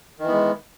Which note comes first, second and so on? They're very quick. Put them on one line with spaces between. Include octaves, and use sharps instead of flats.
D#3 E3 B3 G#3